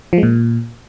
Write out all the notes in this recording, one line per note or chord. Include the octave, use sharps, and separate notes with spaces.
F3
G#3
A#2